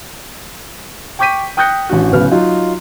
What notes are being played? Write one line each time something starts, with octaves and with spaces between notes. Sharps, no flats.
G5 C#6 D6 G6 B6 D#7
G5 D#6 F#6 G6 A#6 C#7
A1 D4 F#4
D1 C#3 B3 F6
F#3 D#4 F4